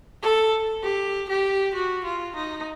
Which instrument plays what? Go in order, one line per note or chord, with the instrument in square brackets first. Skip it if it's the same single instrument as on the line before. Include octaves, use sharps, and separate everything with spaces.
[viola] A4
G4
G4
F#4
F4
D#4